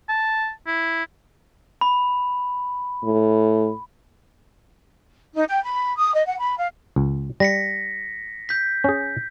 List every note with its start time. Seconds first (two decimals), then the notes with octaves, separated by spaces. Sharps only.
0.09 A5
0.67 E4
1.81 B5
3.04 A2
5.34 D#4
5.47 G5
5.63 B5
5.97 D#6
6.14 D#5
6.26 F#5
6.39 B5
6.58 F5
6.96 C#2
7.40 G3 A#6 B6 C#7
8.49 G6 B6
8.84 C#4 G#4